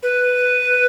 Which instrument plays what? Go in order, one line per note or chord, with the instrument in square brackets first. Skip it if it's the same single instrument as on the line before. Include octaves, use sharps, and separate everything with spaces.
[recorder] B4